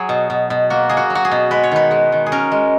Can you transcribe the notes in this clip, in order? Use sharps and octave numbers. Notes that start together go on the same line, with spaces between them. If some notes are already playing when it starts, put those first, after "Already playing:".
Already playing: F#3 G#4
B2
B2
B2
A#3 F#4
A#3 G#4
F#4
F#3
F#4
G#4
B2
G#3 B4
C#5
D#3 B4
G#3
D#3
G#4
C#4 A#4
G#3